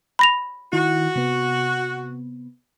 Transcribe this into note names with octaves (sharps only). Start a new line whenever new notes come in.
B5 A#6 F7
D#3 E4 F#4
C3 B3